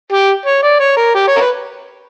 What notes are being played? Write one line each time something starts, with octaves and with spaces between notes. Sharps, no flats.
G4
C#5
D5
C#5
A#4
G4
C#5
A#4
B4